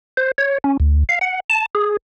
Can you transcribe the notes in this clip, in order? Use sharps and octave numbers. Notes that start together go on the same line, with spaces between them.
C5
C#5
C#4
D2
F5
F#5
A5
G#4